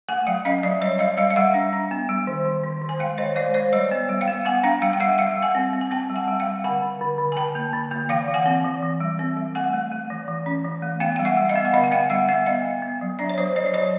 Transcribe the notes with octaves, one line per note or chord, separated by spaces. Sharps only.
A3 F#5 G#5
F#3 F5 G5
C#4 D#5 F5
F#3 D5 E5
G3 C#5 D#5
G3 D#5 F5
G3 D#5 F5
F5
G3 E5 F#5
D4
D4
B3
G3
D#3
D#3
D#3
D#3
G#5
G#3 F5 G5
D#3 C#5 D#5
G#3 C5 D5
G#3 C5 D5
G3 C#5 D#5
B3
G3
F5 G5
B3
B3 F#5 G#5
D4 F5 G5
G3 F5 G5
G5
G3 E5 F#5
G3 F5 G5
G3
F#5 G#5
C4
C4
G#5
C4 G5 A5
G3
F#5 G#5
G3
F5 G5
G3
D3 F#5 G#5
D3
D3
D3
G#5
D3 G5 A5
A#3
D3
A#3
E3 F5 G5
E3
F#5 G#5
C4
E3
E3
G3
C4
G3
A3 F#5 G#5
A3
A3
E3
E3
C#4
E3
A3
B3 F5 G5
G3 G5
E5 F#5
G3
D#5 F5
B3
F#5
D3 D#5 F5
F#5
B3 F5 G5
G3 E5 F#5
B3 E5 F#5
B3 D#5 F5
B3
B3
F#3
D4 D5 E5
C#5
F#3 C5 D5
F#3 C#5 D#5
D5
F#3 C#5 D#5